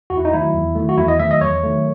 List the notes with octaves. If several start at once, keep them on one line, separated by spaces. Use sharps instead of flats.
E2 F#4
E4
D#4
D#3 F#3 A3 E4
E2
D#3 F#3 A3
F#4
E2 E4
D#5
D#3 F#3 A3 E5
D#5
E2 C#5
D#3 F#3 A3